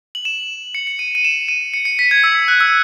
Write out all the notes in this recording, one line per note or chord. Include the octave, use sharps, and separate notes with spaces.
F#7
E7
C#7
C#7
D#7
D#7
E7
D#7
C#7
C#7
B6
G#6
E6
F#6
E6